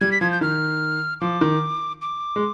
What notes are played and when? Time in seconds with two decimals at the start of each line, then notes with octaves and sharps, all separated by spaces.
0.01 G3 G#6
0.12 B6
0.21 F3 G#6
0.32 G6
0.41 D#3 F6
1.21 F3 D6
1.41 D#3
2.02 D6
2.36 G#3